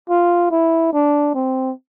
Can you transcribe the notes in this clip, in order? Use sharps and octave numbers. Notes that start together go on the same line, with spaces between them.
F4
E4
D4
C4